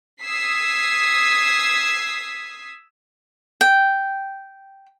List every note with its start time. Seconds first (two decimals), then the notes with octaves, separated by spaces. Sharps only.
0.22 D#6 E6 G#6 B6 C7
3.61 G5